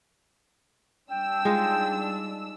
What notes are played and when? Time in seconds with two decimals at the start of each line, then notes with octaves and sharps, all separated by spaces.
1.11 G3 D4 G5 E6
1.45 G#3 D#4 F4